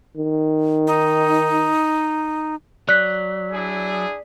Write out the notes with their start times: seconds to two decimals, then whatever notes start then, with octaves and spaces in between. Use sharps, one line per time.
0.17 D#3
0.87 D#4
2.89 F#3 D5 F#6 B6
3.52 D4 E4 G#4